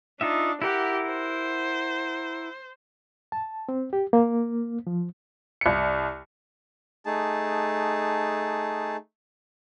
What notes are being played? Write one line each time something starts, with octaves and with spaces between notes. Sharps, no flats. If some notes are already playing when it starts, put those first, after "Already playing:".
D4 D#4 F4 E5
E4 G4 A#4 F#5
C5
A5
C4
G4
A#3
F3
C2 C#7
A3 D#4 G#4 A5